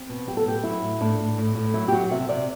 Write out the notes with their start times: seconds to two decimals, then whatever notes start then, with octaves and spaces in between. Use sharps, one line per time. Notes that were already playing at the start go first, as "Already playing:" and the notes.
Already playing: C4
0.09 B2
0.27 F#3 G4
0.37 A4
0.45 A2 G4
0.64 F#3 E4
0.82 A2
1.01 A2 D4
1.18 A2
1.38 A2
1.55 A2
1.74 F#3 E4
1.88 G4
1.92 F#3 F#4
2.11 C3 E5
2.29 C3 D5